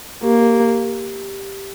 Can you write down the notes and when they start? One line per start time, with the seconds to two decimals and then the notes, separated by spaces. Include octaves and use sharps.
0.24 A#3 G4
0.38 G4
0.53 G4
0.67 G4